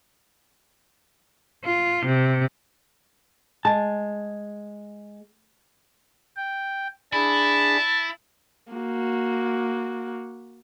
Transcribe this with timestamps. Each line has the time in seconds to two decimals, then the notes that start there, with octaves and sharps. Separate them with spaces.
1.65 F4
2.05 C3
3.65 G#3 A5
6.37 G5
7.13 D4 E4 G#4 A5 B5
8.72 A#3 F#4